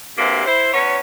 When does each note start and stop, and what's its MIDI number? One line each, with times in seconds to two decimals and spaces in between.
0.18 0.42 38
0.18 0.42 43
0.18 0.42 48
0.18 0.42 58
0.45 0.71 64
0.45 0.71 72
0.73 0.98 40
0.73 0.98 59
0.73 0.98 61
0.73 0.98 73